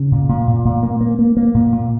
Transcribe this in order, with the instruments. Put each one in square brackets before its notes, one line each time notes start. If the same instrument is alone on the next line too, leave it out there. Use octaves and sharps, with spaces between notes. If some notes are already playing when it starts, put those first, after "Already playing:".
Already playing: [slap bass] C#3
A#2
A#2
A#2
A#2
A#3
A#3
A#3
A#3
A#2
A#2